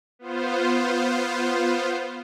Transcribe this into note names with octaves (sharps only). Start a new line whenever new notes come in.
B3 F4 C5